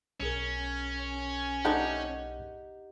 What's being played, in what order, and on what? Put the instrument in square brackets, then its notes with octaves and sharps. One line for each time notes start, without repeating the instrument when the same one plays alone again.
[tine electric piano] B1 G#4 A#4 [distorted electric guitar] C#4
[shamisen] F3 A3 D4 [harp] D#4 G4 F#5